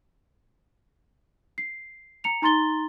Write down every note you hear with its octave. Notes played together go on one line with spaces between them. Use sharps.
C7
A#5 C#7 F7
D#4 A#5 C6 A6 G7